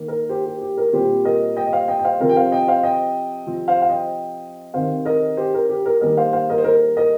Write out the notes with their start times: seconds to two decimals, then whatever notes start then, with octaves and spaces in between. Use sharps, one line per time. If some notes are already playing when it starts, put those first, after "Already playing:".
Already playing: D#3 A#3
0.08 A#4
0.29 G4 C5
0.46 G4
0.61 G4
0.77 A#4
0.93 A#2 G3 C4 G4 C5
1.25 A#4 D#5
1.56 D#5 G5
1.67 D#5
1.73 C5 F5
1.88 D#5 G5
1.99 G5
2.05 C5 F5
2.20 C3 F3 C4 A#4
2.29 G5
2.36 C5 F5
2.52 D#5 G5
2.68 C5 F5
2.83 D#5 G5
3.47 C3 F3 C4
3.68 C5 F5
3.82 F5
3.89 D#5 G5
4.74 C3 D#3 C4 C5 F5
5.05 A#4 D#5
5.37 G4 C5
5.54 A#4
5.69 G4
5.86 A#4
6.01 D#3 G3 A#3 A#4 D#5
6.17 C5 F5
6.33 C5 F5
6.50 A#4 D#5
6.58 C5
6.64 A#4
6.97 A#4 D#5